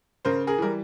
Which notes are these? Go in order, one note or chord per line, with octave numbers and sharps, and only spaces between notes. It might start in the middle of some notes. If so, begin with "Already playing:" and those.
C#3 A#4 C5
G#4 A#4
E3 G3 A#4